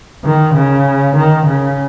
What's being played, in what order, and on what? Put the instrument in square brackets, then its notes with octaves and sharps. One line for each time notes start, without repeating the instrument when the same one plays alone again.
[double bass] D#3
C#3
D#3
C#3